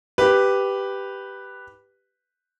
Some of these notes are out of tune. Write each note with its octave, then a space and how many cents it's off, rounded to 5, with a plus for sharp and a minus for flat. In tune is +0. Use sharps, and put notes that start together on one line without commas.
G4 +0 B4 +0